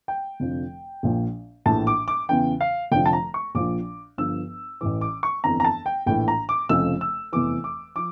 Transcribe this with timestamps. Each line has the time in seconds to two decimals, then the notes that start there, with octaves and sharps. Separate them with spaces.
0.08 G5
0.40 F1 F2 D3 F3
1.03 A#1 A#2 F3
1.66 A#1 A2 E3 A5
1.87 D6
2.08 D6
2.29 E2 C#3 E3 G5
2.61 F5
2.92 F1 F2 D3 F3 G5
3.06 A5
3.13 A#5
3.34 C#6
3.55 A#1 A#2 F3 D6
4.18 G1 G2 F3 E6
4.81 A1 A2 E3 D6
5.01 D6
5.23 C#6
5.44 G1 F2 E3 A#5
5.60 A#5
5.64 A5
5.86 G5
6.06 A#1 A2 E3 G5
6.28 A#5
6.49 D6
6.69 F1 F2 C#3 F3 E6
7.01 E6
7.33 F1 E2 E3 D6
7.64 D6
7.96 F3 D6